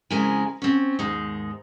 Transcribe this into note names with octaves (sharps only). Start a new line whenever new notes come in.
F2 C#3 G#3 E4 A#4 G#5
C4 C#4
D#2 G#2 G#3 D#4